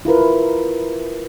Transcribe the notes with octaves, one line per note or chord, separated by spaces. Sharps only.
E4 F4 A#4 B4